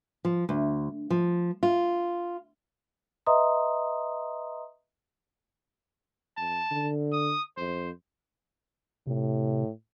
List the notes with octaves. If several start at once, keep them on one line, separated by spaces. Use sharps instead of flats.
F3
D2
F3
F4
B4 D#5 E5 A#5 C6 D#6
F2 A5
D3
D#6
F2 C5
A2 C3